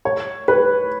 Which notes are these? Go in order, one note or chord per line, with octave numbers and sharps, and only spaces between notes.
C#5
B4